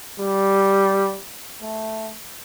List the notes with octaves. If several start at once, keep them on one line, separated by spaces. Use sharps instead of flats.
G3
A3